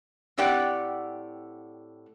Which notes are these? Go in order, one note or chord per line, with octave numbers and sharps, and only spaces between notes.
A2 C4 G4 D5 F#5 G5